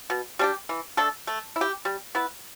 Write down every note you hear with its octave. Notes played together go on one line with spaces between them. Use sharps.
B2
G3 D4 G4
E3
A3 D4 A4
A3
E4
G4
G3
B3 E4 B4